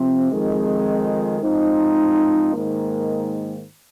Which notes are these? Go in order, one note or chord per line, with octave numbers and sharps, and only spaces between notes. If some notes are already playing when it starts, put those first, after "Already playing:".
Already playing: C3 F3 C4
F2 D#3 G#3
G#2 F3 C4 D#4
G#2 D#3 A#3